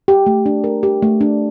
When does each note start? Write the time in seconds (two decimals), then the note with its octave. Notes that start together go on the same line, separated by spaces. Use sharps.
0.08 G4
0.27 A3
0.46 D4
0.64 A#4
0.83 G4
1.02 A3
1.21 D4